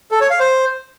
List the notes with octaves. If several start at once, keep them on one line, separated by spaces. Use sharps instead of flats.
A4
C#5
F5
C5